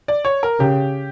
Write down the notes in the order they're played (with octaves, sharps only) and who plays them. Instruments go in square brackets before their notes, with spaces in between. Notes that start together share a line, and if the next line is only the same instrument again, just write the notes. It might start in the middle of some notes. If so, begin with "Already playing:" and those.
[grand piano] D5
C#5
A#4
[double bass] C#3 [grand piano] G4